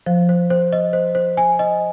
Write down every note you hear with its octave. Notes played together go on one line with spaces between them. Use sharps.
F3 C5
C5
C5
D#5
C5
C5
G#5
D#5